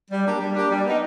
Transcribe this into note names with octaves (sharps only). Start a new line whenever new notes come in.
G3
A#3 D4 G4
G3
A#3 D4 G4
G3
B3 D#4